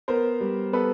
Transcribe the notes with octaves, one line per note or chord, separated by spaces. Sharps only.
B3 A#4 C5
G3
B3 A4 B4